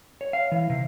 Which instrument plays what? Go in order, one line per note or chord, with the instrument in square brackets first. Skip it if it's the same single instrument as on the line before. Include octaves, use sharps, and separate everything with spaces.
[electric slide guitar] C#5
F5
E3
C3